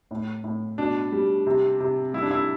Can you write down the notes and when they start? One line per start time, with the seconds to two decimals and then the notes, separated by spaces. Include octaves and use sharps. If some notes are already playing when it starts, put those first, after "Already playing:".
0.11 A2
0.44 A2
0.78 B2 D4
1.12 G3
1.46 C3
1.80 C3
2.13 G3 E4
2.22 D4
2.31 E4